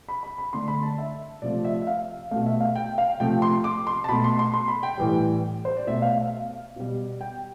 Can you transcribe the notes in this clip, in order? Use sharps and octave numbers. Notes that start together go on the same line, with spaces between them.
B5
B5
B5
D3 A3 C6
B5
A5
E5
C3 F3 A3 D5
E5
E5
F5
B2 A3 F5
E5
F5
G5
F5
C3 F3 A3 G5
C6
D6
C6
A5
B2 A3 B5
C6
C6
C6
B5
G5
A2 E3 G3
C5
D5
B2 A3 E5
F5
F5
B2 G3
G5